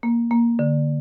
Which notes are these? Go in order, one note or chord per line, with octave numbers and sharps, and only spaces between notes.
A#3
A#3
D3